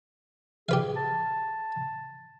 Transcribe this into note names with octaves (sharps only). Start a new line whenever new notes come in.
G4 G#4 B4 F5
A5